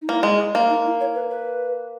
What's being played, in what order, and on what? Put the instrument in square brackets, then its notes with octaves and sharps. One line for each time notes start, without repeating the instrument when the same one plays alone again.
[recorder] D#4
[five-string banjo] A#3 [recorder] E4
[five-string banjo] G#3
A#3
[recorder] D#4
E4
C#5
B4
B4